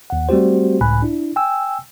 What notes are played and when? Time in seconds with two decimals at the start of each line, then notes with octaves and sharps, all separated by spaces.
0.10 D#2 F#5
0.29 G3 A3 C4 F#4 G4 C5
0.81 C#2 A2 G#5 B5 F#6
1.02 D4 E4
1.36 G5 G#5 E6